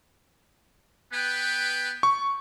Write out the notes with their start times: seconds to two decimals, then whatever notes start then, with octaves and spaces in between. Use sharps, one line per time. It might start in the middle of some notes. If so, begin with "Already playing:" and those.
1.13 B3 B4 G5
2.03 C#6